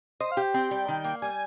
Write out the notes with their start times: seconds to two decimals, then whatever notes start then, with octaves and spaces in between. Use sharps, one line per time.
0.20 C5 D#5
0.32 F5
0.37 G4
0.54 C4 G5
0.71 G3
0.88 D#3
1.04 A#3
1.22 G3 G#5